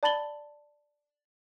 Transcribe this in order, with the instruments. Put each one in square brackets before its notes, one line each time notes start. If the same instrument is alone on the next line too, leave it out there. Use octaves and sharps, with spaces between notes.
[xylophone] D5 A5 B5 A6 F#7 G7